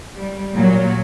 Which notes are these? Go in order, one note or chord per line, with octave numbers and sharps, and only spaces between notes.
G3
A#2 F#3